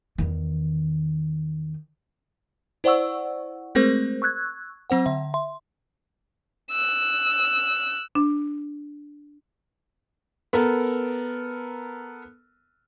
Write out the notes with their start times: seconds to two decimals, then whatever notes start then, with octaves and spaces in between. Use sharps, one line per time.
0.18 E2 D#3
2.84 E4 C5 D5 F#5 C#6 E6
3.75 G#3 A3 C4 G#4 A#4 C5
4.22 C#6 E6 F#6 G#6
4.90 F#3 C4 C5 F#5
5.06 D3 E5
5.34 E5 C6
6.71 E6 F#6
8.15 D4
10.53 B3 A4 A#4